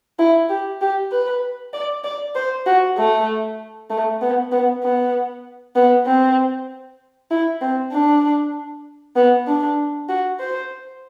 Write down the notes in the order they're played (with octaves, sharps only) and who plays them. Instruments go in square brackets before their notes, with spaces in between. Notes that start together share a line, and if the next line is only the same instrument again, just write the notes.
[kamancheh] E4
G4
G4
B4
D5
D5
C5
F#4
A3
A3
B3
B3
B3
B3
C4
E4
C4
D4
B3
D4
F#4
C5